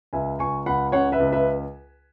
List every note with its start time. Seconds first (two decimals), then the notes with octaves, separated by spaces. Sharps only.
0.13 C#2 E5 G#5
0.39 C#2 G#5 C#6
0.66 C#2 F#5 B5
0.92 C#3 C#5 F#5
1.12 B4 E5
1.19 C#2
1.32 B4 E5